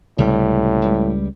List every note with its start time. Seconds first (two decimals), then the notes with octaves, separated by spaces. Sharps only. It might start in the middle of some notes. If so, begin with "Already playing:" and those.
0.18 C#2 A2 C3 G3
0.82 C#2 G3